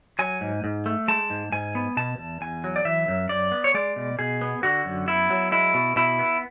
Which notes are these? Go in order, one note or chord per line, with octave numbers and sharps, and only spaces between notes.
F#3 G#5
G#2
G#2
A3
G#3 A5
G#2
G#2 G#5
B3
B2 A5
E2
E2 G#5
F#3
D5
E3 E5
F#2
F#2 D5
B3
C#5
G#3 D5
B2
B2 G#4
B3
D3 F#4
F#2
B3 E4
F#3
G#3 E4
B2
B2 E4
B3